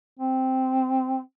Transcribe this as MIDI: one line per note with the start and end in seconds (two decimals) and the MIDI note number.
0.19 1.19 60